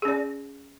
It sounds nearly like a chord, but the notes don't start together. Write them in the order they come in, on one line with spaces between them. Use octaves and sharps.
G#4 C#4 D5